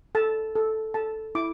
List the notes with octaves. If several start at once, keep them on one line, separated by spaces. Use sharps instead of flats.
A4 A5
A4
A4 A5
E4 D6